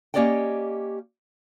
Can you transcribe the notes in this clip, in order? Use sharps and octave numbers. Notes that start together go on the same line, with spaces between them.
A#3 C#4 G4 D5 D#5 G5